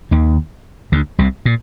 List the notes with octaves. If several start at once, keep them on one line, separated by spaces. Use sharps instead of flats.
D#2 D#3
D2 D3
C2 C3
A#2